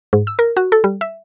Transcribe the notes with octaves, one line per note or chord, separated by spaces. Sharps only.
G#2
E6
A#4
F#4
A4
G3
E5